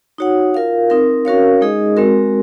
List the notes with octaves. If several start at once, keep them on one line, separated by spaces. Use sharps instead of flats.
D#4 F#4 C#5 F#5
F4 A#4 F5
C4 D#4 A#4
C#4 F#4 A#4 C#5 F5
G#3 D#4 G#4 D#5
G#3 C4 F#4 A#4